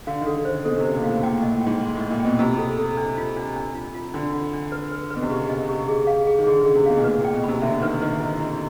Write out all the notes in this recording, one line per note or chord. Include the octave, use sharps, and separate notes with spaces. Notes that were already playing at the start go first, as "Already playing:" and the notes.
D3 F5
D#3
A4
D3
C5
C#3
B2 A4
C#3
C3
C5
A#2
A2 F5
A#2 G5
A2 D#5
A2
G5
G#2
C6
A2
D#5
A#2
G5
B2
C3 F4
A4
A4
D4
F4
D4
D4
F4
F4
D3 D4
F4
D4
B4
B4
B4
B2
C3
C#3 G4
D#5
G4
G#4
F5
G#4
D#3
D3 G#4
C#3 G#4
C3
B2 F5
A#2
A2 B4
A#2
G5
B2
C3 B5
D3 E5
D#3 B4
D#3 B4
E4
E4